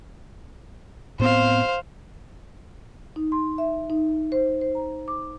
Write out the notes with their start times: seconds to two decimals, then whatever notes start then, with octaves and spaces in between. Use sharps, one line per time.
1.20 A2 B3 C4 C5 F5
3.16 D#4
3.32 C6
3.58 E5
3.90 D#4
4.32 C5
4.62 C5
4.75 A#5
5.08 D6